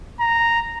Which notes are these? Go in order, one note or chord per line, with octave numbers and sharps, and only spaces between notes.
A#5